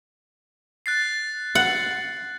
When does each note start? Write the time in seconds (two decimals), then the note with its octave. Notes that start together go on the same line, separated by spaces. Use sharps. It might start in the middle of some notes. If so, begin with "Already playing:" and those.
0.86 F#6 A6 C7
1.55 F#5